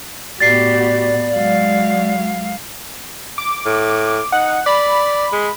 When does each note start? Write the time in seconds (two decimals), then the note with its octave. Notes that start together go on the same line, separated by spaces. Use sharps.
0.40 A2 B3 F#4 G4 D5 A6 C7
1.35 F#3 G#3 F5
3.38 D6
3.66 A2
4.32 D#4 F#5
4.66 D5 B5
5.33 G#3